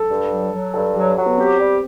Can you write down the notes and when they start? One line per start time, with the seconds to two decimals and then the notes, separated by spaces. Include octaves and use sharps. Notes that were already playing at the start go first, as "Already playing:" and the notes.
Already playing: A4
0.09 G2
0.31 F#3
0.53 F#3
0.74 G2 A4
0.95 F#3 G4
1.16 F#3
1.26 B3
1.38 C4 G4
1.59 G3